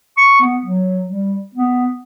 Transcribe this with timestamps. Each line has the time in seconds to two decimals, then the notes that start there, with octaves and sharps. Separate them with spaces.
0.17 C#6
0.41 B3
0.66 F#3
1.06 G3
1.55 B3